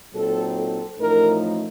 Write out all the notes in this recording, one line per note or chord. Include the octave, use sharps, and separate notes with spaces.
A#2 F#3 C4 D#4 A4
A4
A1 A2 F3 A3 D#4 A#4